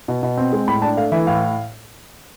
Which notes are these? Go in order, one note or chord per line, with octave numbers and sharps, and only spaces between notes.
B2
B2
C4
G#3
A2 B5
D4 A5
A3 F5
E3 E5
A2 F5